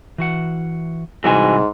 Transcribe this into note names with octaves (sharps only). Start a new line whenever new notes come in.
E3 F#4 F#5
G#2 C3 E3 G3 F#4 G#5